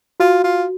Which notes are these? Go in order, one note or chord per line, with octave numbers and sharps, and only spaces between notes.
F4 F#4
F4